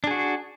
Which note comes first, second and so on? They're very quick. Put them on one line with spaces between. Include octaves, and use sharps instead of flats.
D4 G#4 F#4